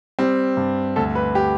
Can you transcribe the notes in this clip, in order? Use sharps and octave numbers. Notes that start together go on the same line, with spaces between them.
G3 C4
G2
D2 A4
B4
G4